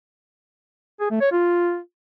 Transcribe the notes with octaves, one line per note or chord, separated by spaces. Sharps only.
G#4
A3
C#5
F4